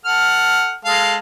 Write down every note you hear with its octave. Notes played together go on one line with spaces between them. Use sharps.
A4 F#5 F6
G#3 A4 F5